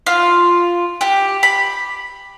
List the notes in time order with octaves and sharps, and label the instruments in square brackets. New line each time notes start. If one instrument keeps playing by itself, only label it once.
[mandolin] F4
G4
B5